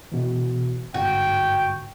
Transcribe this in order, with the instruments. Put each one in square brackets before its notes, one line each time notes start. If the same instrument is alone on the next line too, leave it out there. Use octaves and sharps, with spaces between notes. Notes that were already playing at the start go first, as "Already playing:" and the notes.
[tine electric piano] B2 E3
[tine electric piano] G1 G#2 [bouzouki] F#4 [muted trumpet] G5